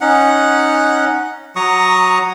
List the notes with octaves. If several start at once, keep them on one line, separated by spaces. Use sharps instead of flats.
C#4 D#4 F#5
F#3 A#5 C#6 D#6